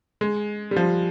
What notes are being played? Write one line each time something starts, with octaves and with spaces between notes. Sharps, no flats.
G#3
G3
F3